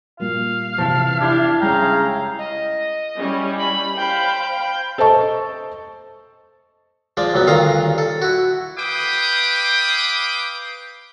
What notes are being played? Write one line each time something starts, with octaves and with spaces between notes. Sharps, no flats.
A#2 G3 A#3 F5
E2 C3 F3
D4 E4 G4 E5
C#3 G3 G#3 F5 G5 A#5
D#5
G3 C#4 E4
B5
C5 F5 G5 B5
A4 C5 D#5 A5 C#6
F3 G#3 D5
C#2 F#2 F#3 B3
D2 G2 D#3 F4 F5 A#5
A4
E4 F#4
B4 F5 G5 D6 D#6